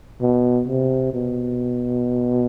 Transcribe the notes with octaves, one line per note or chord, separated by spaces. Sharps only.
B2
C3
B2